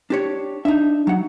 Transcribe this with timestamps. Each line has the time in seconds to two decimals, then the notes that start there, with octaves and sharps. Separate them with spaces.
0.10 D4 G4 C#5
0.65 D4 D#4 E5
1.07 F#3 F#5